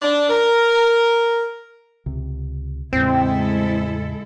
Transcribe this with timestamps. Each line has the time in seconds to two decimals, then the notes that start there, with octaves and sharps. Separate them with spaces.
0.02 D4
0.29 A#4
2.06 C#2 C3
2.93 E2 A2 C#3 G#3 C4 E4 A4